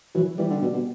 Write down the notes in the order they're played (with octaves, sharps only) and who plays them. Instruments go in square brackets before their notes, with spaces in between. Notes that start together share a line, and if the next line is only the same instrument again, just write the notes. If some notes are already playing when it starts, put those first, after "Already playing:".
[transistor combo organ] E3 [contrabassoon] F#3
[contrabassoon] E3 [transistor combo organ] G3
[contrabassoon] D3
B2
B2